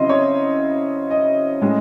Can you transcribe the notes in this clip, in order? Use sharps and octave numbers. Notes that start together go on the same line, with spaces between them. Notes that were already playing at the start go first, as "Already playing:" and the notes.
Already playing: C#3 F#3 C4 E4 D#5 C6
C#5
D#5
A2 G#3 C#4